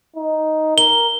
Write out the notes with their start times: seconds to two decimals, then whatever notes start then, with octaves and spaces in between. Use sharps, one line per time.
0.16 D#4
0.78 A#4 G7